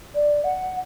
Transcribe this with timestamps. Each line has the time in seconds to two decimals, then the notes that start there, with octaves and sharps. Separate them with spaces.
0.15 D5
0.44 F#5